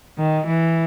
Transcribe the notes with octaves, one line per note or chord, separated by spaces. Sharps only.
D#3
E3